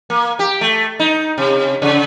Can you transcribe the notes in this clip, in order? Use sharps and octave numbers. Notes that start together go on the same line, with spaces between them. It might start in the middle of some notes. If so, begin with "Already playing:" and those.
A#3
G4
A3
D#4
C3
C#3